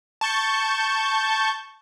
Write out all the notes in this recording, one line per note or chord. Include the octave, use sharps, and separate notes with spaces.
A5 C#6 G6